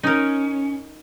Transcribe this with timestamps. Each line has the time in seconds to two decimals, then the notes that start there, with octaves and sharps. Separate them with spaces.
0.03 C#4 D#4 A#4